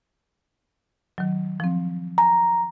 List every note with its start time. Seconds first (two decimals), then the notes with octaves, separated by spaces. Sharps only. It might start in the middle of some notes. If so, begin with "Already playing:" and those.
1.18 D#3 F#3
1.60 F3 C4
2.18 G#5 A#5